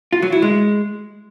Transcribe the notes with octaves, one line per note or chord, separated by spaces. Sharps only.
F4
F#3
E4
G#3